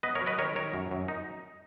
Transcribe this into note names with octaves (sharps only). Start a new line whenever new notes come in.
B3 B4 D#5
A#4 C#5
F#3
B4 D#5
D#3 A#4 C#5
D#3 A#4 C#5
F#2
F#2
D#4